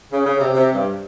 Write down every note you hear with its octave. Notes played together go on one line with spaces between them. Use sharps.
C#3
C#3
C3
C3
G2